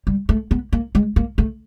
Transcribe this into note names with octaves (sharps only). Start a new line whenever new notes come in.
G3
A3
B3
A#3
G#3
A#3
A3